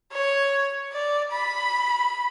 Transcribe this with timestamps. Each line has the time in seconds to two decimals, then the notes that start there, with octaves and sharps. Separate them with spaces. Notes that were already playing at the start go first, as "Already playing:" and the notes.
0.12 C#5
0.93 D5
1.31 B5